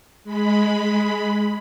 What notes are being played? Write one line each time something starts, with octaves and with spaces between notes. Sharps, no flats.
G#3 B5